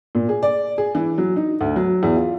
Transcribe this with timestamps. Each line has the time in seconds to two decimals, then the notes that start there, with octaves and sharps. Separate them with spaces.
0.15 A#2
0.29 G#4
0.43 D5
0.78 G#4
0.95 E3
1.18 F#3
1.36 D#4
1.61 D2
1.76 F#3
2.03 E2
2.17 F4